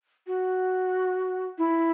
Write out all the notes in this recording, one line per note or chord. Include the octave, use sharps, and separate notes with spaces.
F#4
E4